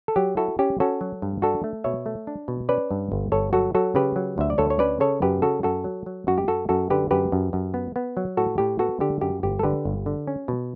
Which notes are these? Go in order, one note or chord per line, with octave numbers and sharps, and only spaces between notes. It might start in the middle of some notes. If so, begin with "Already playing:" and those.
A4
F#3 G4
E4 F#4 A4
C#4 G4
C#4 F#4 A4
F#3
G2
D4 F#4 A4
A3
B2 C#5 E5
A3
D4
B2
C#4 B4 D5
G2
G1
G1 A4 C#5
F#3 F#4 A4
F#3 F#4 A4
C#3 G4 B4
F#3
D2 E5
D5
D2 A4 C#5
C#5
C#4 B4 D5
C#3 A4 C#5
F#2 G4 B4
C#3 F#4 A4
F#2 F#4 A4
F#3
F#3
F#2 F#4
G4
F#2 F#4 A4
F#2 F#4 A4
D3 G4 B4
F#2 G4 B4
F#2
F#2
B3
B3
F#3
A2 F#4 A4
A2 G4
B3 F#4 A4
D3 G4
F#2 G4
G1 G4
A4
D3 G4 B4
G1
D3
C#4
B2